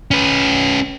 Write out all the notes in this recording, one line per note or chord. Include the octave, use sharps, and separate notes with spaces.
C#4 B4